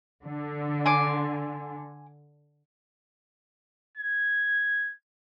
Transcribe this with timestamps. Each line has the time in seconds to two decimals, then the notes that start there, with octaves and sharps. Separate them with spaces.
0.24 D3
0.86 G#5 C6 D6
3.97 G#6